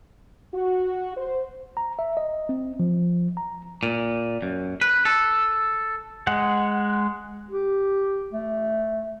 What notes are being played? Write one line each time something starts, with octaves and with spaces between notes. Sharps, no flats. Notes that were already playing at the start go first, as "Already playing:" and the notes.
F#4
C5
A#5
E5
D#5
C4
F3
A#5
A#2
F#2
B4
A4
G#3 F#5
G4
A3